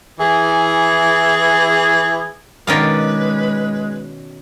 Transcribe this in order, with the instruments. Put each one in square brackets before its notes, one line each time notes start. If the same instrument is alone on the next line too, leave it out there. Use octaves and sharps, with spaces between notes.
[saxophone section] E3 G#4
[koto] B2 C#4 D5 [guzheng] D#3 D#5 F5 [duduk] G#3 [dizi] B4